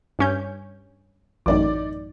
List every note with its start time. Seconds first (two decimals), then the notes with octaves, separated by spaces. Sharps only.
0.19 G2 C#4 G6
1.46 A1 F#2 A2 D#4 D5 D6